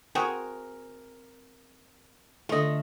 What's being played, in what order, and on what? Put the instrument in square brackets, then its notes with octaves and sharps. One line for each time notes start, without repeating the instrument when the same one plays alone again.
[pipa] C4 F#4 G#4 [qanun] A#4
[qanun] D3 A3 [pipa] F4 D#5